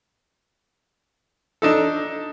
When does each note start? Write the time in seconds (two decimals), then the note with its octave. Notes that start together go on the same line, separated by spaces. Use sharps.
1.62 D4 D#4 A4